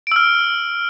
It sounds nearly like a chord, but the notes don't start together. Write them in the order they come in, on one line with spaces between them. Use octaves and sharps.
D7 E6 F6